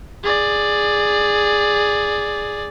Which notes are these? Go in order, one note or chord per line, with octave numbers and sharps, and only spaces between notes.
G#4 D5